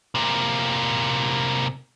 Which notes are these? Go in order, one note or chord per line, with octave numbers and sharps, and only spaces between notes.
C3 A#3